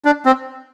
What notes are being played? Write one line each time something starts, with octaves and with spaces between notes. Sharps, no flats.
D4
C4